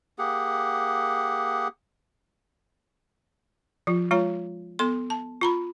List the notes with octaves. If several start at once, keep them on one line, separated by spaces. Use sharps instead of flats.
A#3 G4 G#4 F#5
F3 F4
G#3 F4 C#5 A#5
B3 A4 C6
A5
F4 A#5 B5